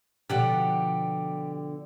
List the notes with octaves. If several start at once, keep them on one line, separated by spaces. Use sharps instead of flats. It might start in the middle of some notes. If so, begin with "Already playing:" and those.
B2 D3 F3 G4 F#5